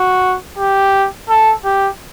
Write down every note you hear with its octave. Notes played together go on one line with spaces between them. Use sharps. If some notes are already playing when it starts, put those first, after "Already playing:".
Already playing: F#4
G4
A4
G4